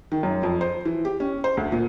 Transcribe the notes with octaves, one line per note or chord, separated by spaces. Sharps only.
D#3
F#2
F2
C5
E3
G4
C#4
C5
D2
A#2